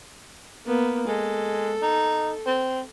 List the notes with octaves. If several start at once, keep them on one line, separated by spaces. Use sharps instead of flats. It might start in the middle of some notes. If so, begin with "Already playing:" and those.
A#3 B3
G#3 A4
D#4
C4